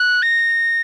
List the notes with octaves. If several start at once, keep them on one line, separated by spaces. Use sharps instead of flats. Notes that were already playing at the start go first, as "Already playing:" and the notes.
Already playing: F#6
A#6